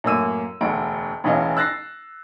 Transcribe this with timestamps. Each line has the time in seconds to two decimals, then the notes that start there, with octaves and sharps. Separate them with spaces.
0.04 F#2 A2 A#3 E6 D#7
0.61 E1 D2 D7
1.24 E1 A1 E3 C#4 D#5 F5
1.57 E6 F#6 A6 A#6 C7